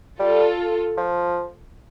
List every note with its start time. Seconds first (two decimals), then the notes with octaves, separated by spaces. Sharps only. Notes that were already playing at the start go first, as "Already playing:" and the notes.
0.20 G3 F4 A4
0.97 F3